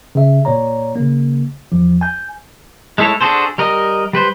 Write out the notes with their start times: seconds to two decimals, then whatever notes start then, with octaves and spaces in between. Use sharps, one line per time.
0.15 C#3 E5
0.45 A#2 A#3 C#5 D5 A#5
0.95 C#3 A#3
1.72 E2 F3
2.01 G#5 G6
2.98 G#3 A3 E4 A4 C#5
3.21 D4 F#4 G#4 A4 C5
3.58 G3 A#4 D#5
4.13 G3 B4 C5